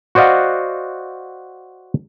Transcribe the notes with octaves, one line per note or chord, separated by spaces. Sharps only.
F#4 C5 D5 D#5 F5 F#5